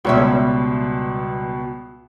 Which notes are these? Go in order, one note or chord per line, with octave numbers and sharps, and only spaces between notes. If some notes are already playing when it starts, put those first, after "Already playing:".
C#2 B2 G3 C#5 E5